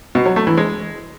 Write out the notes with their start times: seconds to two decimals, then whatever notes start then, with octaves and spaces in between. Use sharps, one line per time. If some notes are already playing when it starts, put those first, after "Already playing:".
0.15 B2
0.26 F#3
0.36 A3
0.47 E3
0.57 G#3